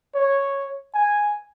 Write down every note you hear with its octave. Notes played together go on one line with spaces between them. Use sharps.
C#5
G#5